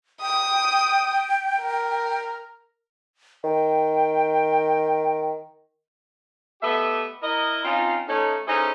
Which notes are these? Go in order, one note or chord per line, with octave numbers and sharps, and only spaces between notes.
G5 D#6
A#4
D#3 G5
A3 B3 G4 D#5 E5
E4 A#4 D#5
C4 C#4 D#4 F4
A3 C#4 D#4
C#4 D#4 E4 G#4 A4 C5